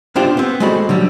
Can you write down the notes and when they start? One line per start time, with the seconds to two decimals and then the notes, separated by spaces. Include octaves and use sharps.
0.15 B3 D4 F4 G4 C5 G5
0.37 B3 C4
0.60 G#3 A3 C4 F#4 D5 B5
0.89 D3 F#3 G3